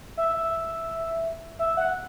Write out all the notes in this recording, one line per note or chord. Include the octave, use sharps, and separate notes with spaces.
E5
E5
E5
F#5